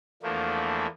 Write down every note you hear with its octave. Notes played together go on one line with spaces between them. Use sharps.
E2 E3 F3 A3 A#3 D4